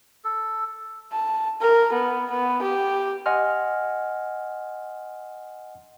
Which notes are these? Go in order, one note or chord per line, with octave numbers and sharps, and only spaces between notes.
A4
A5
A#4
B3
B3
G4
D#5 F#5 G#5 C6 F6